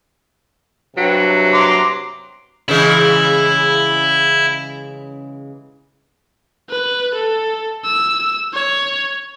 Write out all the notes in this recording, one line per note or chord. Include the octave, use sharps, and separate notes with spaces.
G2 C3 F#3
A#5 C6 D6
C#3 E3 G#3 E4
B4
A4
E6
C#5